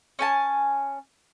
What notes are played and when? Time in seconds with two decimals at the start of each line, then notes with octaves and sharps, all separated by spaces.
0.19 C#4 G#5 A5